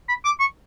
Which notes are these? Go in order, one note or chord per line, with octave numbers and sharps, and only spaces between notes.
B5
D6
C#6